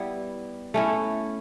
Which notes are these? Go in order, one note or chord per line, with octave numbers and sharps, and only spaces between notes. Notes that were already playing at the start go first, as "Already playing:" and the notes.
Already playing: G3 B3 E4
A3 C#4 E4